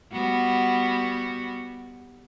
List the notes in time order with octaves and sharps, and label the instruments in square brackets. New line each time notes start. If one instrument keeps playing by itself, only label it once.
[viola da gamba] G3 B3 F#4